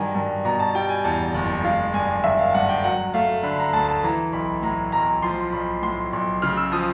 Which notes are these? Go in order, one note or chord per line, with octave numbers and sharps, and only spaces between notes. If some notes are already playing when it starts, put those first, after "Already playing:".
Already playing: G2 D#3 F#3 G#5 A#5
G2
B2 A#5
A5
G3 G5
G#5
E2 A5
F#1
G#3 F5
G2 G#5
D#3 E5
F5
G2 F#5
G5
F#3 F#5
A3 F5
D3 B5
A#5
D2 A5
A5
E3 A#5
B1 B5
A2 A#5
B1 A#5
F3 C6
B1 B5
A2 C6
B1
C#3 F6
E6
F3 D#6